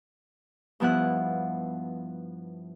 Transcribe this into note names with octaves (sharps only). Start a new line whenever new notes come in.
G2 F3 B3 E4 F#5 F#6